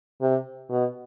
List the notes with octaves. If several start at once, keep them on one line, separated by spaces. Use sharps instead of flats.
C3
B2